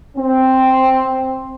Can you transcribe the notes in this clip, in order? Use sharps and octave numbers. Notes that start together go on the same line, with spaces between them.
C4